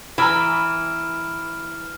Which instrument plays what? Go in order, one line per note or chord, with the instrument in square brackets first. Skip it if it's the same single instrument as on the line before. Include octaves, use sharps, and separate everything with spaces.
[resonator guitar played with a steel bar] E3 [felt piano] A#5 B5 [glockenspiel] F6 D7 E7